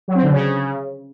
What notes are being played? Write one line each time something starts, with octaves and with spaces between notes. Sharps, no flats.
F#3
C4
D3
C#3